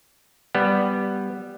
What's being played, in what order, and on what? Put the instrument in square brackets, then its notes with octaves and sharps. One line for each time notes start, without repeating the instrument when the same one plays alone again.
[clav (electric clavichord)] G3 B3